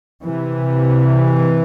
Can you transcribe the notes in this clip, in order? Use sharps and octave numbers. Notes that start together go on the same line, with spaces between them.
C3 E3